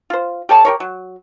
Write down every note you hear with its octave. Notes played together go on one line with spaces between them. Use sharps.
F4 C5
G4 A4 C#5 A5
G4 A#4 C#5
F#3